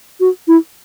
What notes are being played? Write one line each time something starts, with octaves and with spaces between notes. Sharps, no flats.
F#4
E4